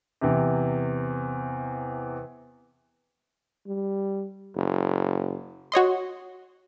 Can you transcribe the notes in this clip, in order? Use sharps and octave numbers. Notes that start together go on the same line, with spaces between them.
E2 C3
G3
F#1
F#4 C#5 D#5 C6